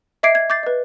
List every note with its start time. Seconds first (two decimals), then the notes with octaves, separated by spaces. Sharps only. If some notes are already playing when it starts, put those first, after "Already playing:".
0.23 D#5 E5 D6 G#6 C7 D7
0.35 G#6
0.50 D6 G6 A6 C7
0.63 B4 D#5